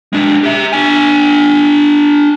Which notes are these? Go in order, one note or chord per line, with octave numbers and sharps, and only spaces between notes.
G#3 D4
G4 E5
D4 G#5